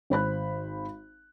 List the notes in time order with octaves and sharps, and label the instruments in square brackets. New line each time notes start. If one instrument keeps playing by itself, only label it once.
[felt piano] G#1 C5 B5 F#6